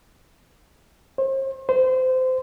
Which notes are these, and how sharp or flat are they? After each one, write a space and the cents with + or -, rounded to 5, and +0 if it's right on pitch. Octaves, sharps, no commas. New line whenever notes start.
C5 +40
C5 -25